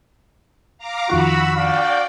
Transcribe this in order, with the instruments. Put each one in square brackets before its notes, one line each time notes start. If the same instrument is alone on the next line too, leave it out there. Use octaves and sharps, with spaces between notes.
[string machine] F5 A#5 D6
[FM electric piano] F2 D#3 F4 [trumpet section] F#4 [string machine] B5 E6
[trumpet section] D4 F#4 F5 [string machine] D5 G5